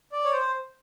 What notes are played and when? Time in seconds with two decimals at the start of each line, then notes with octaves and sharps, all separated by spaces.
0.12 D5
0.24 C#5
0.33 C5